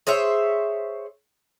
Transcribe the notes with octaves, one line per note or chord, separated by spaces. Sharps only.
G#4 C5 C#5 E5